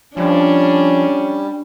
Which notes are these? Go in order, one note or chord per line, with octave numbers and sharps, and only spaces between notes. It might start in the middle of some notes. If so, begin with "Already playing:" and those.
F3 G3 C#4 D4